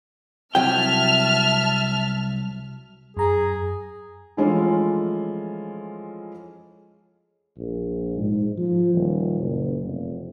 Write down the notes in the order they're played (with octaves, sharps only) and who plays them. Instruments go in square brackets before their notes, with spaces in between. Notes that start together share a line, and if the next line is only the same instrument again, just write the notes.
[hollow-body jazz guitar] C2 F#3 G5 [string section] E5 A5 F6
[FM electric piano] F#2 A#5 [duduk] G#4
[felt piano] E3 F3 G#3 A3 C#4 F4
[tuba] A#1
G#2
F3
D#1
F#1
F1